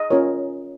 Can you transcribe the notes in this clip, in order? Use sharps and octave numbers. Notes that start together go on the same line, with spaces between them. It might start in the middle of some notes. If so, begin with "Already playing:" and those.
Already playing: D#5
C#4 F4 A#4 C#5